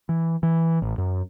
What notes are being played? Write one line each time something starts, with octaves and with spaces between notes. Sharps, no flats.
E3
E3
A1
F#2